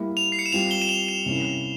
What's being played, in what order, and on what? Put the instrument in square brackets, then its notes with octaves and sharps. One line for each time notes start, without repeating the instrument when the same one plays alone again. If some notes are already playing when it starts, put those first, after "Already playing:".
Already playing: [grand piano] G3 A#3 E4
[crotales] F7
C7
C#7
E7
[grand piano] G3 C4 F4 [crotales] F7
[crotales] G7
E7
F7
E7
[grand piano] C3 G3 A#3 C#4 E4